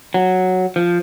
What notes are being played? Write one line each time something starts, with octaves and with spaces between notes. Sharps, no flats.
F#3
F3